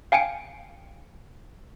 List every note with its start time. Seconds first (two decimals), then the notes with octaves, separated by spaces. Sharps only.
0.12 F5 G5 G#5 C#7 D7